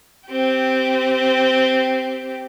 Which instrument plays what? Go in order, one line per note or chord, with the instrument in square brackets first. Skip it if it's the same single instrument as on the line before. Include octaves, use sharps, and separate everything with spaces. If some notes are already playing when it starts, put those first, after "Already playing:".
[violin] C4 G4